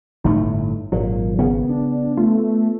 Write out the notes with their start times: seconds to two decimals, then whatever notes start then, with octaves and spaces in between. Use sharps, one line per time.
0.24 G1 A2 A3 D#4
0.92 G#1 A#2 F#3
1.39 C#3 B3
1.69 D4
2.17 A3 F4